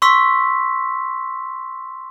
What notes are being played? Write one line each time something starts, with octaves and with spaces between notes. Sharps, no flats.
C6 C#6 E6 B6